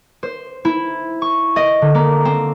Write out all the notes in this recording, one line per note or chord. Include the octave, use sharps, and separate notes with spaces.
C5
E4
C#6
D#5
D3
A#3
C4